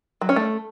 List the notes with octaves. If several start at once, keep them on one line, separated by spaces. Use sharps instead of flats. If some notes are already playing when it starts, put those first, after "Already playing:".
F#3
C#4
A3